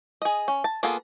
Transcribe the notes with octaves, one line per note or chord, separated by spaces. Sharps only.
G#4 D#5
C#4
A5
A#3 B3 F4 G#4 A4